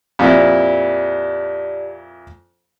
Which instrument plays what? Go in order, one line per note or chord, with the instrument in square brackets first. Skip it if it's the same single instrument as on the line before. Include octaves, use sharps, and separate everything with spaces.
[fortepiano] F2 A#2 E4 [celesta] G4 D5